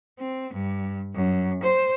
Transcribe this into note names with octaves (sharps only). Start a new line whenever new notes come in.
C4
G2
F#2
C5